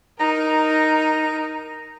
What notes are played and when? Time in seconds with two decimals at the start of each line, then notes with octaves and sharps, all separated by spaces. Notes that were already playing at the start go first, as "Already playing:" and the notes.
0.19 D#4 A#4 A#5